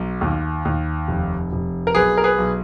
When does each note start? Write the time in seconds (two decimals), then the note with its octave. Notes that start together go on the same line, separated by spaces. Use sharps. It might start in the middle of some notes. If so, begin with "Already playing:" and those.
Already playing: B1
0.21 D#2
0.65 D#2
1.08 F1
1.52 F1
1.87 A#4
1.95 B1 G#4 B4
2.18 A#4
2.24 G#4 B4
2.38 B1